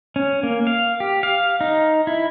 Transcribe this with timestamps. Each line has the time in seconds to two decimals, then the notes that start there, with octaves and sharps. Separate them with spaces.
0.16 C#4
0.43 A#3
0.67 F5
1.00 G4
1.23 F5
1.61 D#4
2.07 E4